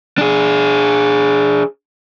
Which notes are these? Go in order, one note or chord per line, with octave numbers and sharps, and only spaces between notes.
D4 G#4